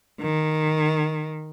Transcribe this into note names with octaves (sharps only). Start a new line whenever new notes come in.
D#3